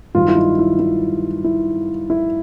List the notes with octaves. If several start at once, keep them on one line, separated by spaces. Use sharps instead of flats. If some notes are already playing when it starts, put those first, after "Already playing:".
G2 D#3 F#3 F4
E4
D#4
E4
E4
E4
E4